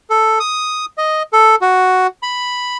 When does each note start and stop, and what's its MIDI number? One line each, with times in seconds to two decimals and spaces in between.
0.10 0.39 69
0.40 0.85 87
0.98 1.23 75
1.33 1.55 69
1.61 2.07 66
2.23 2.77 83